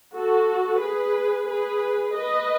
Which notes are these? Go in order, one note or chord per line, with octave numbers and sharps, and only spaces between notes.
F#4 A4
G#4 B4
G#4 B4
B4 D#5